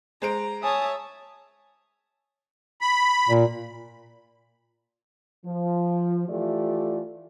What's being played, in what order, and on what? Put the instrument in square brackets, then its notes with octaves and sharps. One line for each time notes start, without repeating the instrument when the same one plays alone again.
[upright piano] G#3 C5 D7 [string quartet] A#5
[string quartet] C#5 E5 [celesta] G#5 [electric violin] A5 D#6
[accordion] B5
[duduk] A#2
[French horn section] F3
E3 A3 F4 G4 D5